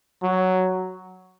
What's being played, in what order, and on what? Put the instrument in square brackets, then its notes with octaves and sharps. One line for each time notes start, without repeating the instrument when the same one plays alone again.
[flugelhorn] F#3